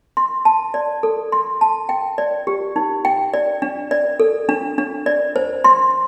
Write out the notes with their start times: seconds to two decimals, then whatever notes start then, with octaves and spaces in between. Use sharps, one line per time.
0.17 C6
0.45 A5
0.74 D5
1.03 A4
1.32 C6
1.61 A5
1.89 G5
2.18 D5
2.47 G4
2.76 D#4
3.05 G5
3.34 D5
3.62 D4
3.91 D5
4.20 A4
4.49 D4
4.78 D4
5.06 D5
5.36 C5
5.64 C6